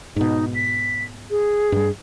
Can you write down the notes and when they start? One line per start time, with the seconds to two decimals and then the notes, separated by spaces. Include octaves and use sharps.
0.16 G#2 B2 D#4
0.55 B6
1.30 G#4
1.72 G2 G3